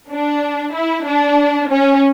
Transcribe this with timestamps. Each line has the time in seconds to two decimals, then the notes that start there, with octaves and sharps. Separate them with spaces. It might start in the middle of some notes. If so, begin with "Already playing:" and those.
0.12 D4
0.75 E4
1.06 D4
1.69 C#4